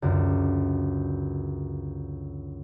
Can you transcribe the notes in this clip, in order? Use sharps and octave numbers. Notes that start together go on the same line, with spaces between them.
C#2 F#2 D3